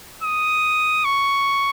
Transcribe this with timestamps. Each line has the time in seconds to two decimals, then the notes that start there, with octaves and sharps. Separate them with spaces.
0.23 D#6
1.05 C#6